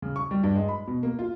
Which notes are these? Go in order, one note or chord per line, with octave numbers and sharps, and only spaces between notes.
C#3
C#6
G3
G2
G#3
B5
B2
A#3
F4